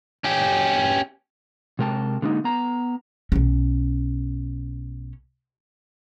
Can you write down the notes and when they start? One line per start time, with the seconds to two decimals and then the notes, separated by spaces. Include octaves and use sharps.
0.24 C#4 G4
1.79 C3 G#3 A#4 G5 A5
2.22 D3 G#3 A#3 C4 D#4
2.44 B3 A#5
3.32 B1 C#4